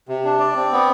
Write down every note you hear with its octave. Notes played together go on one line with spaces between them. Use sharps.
C3
D4
D5
C4
B3